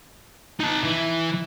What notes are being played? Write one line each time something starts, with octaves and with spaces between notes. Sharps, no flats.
D#4 A5
E3